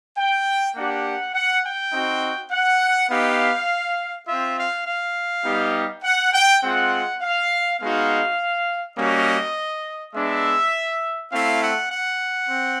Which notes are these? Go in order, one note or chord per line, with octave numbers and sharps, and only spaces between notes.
G5
A#3 D4 G4 F#5
F#5
G5
C4 D#4 F#4
F#5
B3 D#4 G4 F5
C4 F4 E5
F5
F5
G3 B3 D#4 G4
F#5
G5
G#3 C4 F4 F#5
F5
G#3 B3 D#4 F#4 F5
G3 A#3 C#4 F#4 D#5
G#3 B3 D4 E5
A3 C4 E4 F5
F#5
F#5
C4